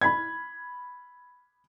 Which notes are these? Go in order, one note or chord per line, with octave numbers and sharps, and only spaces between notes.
B5 G#6